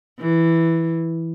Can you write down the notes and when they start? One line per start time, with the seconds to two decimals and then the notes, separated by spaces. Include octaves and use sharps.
0.19 E3